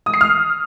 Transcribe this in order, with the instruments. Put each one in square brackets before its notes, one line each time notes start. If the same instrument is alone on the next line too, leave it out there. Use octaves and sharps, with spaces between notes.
[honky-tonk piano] D#6
C7
F6